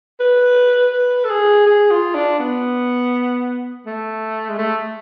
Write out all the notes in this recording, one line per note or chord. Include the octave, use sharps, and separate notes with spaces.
B4
B4
A4
G#4
G#4
F4
D4
B3
A3
G#3
A3